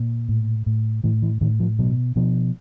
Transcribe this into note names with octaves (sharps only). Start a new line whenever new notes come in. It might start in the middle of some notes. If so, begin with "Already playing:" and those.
Already playing: A#2
A2
A2
A2 E3
E3
A2 D#3
F3
B2 F#3
B2 F3